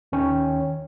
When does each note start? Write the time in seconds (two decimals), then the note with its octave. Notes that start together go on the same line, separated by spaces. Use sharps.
0.12 D#2 D#3 C#4 C#5 G5